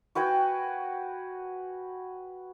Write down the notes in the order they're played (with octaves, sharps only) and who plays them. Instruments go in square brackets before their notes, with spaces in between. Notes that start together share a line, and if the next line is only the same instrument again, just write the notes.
[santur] F#4 B4 G5 G#5